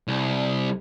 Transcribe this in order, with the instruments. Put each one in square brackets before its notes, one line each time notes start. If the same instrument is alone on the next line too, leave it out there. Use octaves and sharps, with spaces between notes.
[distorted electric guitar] C2